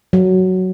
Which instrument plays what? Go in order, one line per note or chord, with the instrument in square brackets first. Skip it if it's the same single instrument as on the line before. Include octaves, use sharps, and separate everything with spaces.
[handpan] F#3